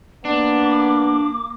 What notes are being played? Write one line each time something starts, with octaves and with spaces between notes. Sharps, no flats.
A#3 B3 D4 D6